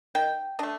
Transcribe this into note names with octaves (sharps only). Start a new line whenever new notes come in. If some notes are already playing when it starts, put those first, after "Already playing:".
D#3 G5
A3 D4 D#5